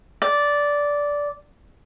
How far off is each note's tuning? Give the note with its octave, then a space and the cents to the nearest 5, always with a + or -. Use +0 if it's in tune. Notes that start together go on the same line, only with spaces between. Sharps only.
D5 -10